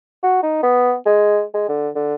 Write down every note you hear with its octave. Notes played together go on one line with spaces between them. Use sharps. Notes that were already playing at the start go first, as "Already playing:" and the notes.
F#4
D#4
B3
G#3
G#3
D3
D3